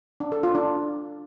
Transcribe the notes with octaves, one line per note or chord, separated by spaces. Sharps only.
D4
A4
F4
D4